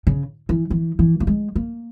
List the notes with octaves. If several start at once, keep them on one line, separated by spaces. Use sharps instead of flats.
C#3
E3
E3
E3
A#3
G#3
A#3